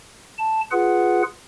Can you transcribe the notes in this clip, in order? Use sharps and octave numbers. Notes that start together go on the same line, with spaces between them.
A5
F4 G#4 B4 F#5